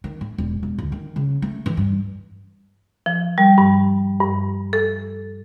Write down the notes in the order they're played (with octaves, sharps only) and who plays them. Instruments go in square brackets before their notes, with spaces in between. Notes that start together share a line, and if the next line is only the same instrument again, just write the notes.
[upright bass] D#3
A2
E1
E1
D2
D#3
C#3
A3
E3
G2
[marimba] F3
G3
G2
G2
A4